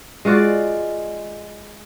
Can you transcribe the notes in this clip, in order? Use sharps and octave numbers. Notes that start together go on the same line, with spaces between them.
G#3 F4 F#4 D5